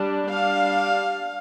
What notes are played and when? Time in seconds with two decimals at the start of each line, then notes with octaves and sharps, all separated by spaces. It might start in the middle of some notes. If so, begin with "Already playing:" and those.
Already playing: G3 D4
0.30 G3 D4 F5